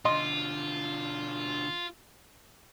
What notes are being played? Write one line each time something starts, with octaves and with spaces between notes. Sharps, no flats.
B2 D3 F4 D#5 C6